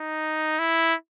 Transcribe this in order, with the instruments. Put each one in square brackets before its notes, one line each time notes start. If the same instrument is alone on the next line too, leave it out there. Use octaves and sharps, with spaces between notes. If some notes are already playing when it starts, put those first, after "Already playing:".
Already playing: [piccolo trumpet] D#4
E4